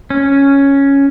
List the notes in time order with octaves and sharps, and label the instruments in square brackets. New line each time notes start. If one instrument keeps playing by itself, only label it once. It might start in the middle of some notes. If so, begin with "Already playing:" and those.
[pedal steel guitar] C#4